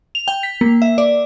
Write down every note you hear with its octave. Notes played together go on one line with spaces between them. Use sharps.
F7
G5
B6
A#3
E5
D5